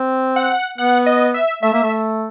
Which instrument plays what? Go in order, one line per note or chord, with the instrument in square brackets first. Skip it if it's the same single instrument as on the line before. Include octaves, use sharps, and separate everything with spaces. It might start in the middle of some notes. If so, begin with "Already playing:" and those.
Already playing: [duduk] C4
[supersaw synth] F#5
[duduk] B3 [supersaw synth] F#5
[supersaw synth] D#5
E5
[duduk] A3 [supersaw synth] E5
[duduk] A#3
A3